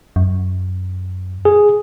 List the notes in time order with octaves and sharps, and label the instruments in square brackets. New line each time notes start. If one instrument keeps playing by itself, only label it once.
[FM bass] F#2
[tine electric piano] G#4